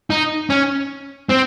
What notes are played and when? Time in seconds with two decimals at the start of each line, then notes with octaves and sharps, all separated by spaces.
0.10 D#4
0.50 C#4
1.29 C4